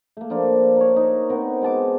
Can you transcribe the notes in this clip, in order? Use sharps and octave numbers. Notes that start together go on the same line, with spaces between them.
A3 A#3
F3 A#3 D4
A#4 C#5
D#4
B3 C4 A#4
G#3 F#4 A5 D6